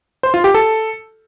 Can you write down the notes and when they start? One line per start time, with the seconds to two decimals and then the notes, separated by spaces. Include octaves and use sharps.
0.23 C5
0.34 F4
0.44 G4
0.54 A4